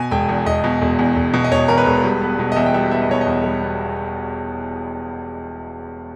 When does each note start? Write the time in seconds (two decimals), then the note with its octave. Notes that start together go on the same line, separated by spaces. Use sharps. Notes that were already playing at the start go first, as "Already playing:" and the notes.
Already playing: B2 G#5
0.11 E1 G5
0.29 E2
0.46 E1 D#5
0.64 B2
0.82 E1
0.99 E2
1.16 E1
1.34 B2
1.44 D#5
1.51 E1 C#5
1.68 E2 A#4
1.78 B4
1.87 E1
2.04 G3
2.22 B3
2.39 B2
2.52 D#5
2.56 E2 E5
2.66 G5
2.74 G3 E5
2.91 B3 E5
3.01 D#5
3.09 B2 C#5
3.21 D#5
3.27 E2
3.44 G3
3.62 B3